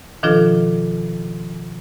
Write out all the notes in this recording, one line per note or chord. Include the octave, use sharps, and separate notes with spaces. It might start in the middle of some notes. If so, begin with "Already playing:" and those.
B2 D#3 F3 D4 F4 A4